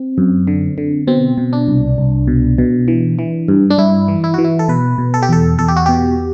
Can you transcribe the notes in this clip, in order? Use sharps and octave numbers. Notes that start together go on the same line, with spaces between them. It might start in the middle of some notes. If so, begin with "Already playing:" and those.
Already playing: C4
F#2
D3
D3
B2 C4
B2
D4
C2
C2
B2
B2
E3
E3
G2
D4
G2 E4
E3
E4
E3 F#4
E4
A4
B2 B4
B2
A4
G4
E2 A4
E2 A4
G4
F#4
B2 G4